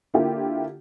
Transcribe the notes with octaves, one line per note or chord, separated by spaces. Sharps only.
D3 A#3 E4 F4 G4